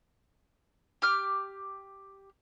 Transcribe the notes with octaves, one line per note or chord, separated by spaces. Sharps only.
G4 D6 F6